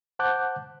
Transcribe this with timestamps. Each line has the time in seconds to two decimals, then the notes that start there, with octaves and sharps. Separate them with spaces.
0.19 C5 F#5 A5 D6 F#6 G6